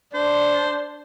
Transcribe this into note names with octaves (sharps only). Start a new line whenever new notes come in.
D4 C5